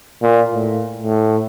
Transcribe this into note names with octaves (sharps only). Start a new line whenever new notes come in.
A#2
A2
A2